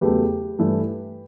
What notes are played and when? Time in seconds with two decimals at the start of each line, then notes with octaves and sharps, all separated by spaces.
0.01 E2 C#3 F#3 A3 G4 B4
0.59 G2 E3 A3